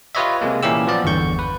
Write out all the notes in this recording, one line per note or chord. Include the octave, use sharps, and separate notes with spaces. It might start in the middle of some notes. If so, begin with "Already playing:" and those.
F4 G4 B4 C#5 D#5 E5
C3 G#3 A#3
A#2 E3 C#4 E4 G4 E6
F3 F#3 B3 D5
G1 E2 G2 D3 C#6 G6
B4